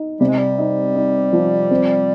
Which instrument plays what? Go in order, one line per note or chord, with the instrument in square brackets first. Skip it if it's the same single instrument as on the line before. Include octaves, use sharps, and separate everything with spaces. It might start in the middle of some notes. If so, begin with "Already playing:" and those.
Already playing: [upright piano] D#4
[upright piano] C3 [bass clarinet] G3
[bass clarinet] G#3
G3
[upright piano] D#4
D#4
F3
C4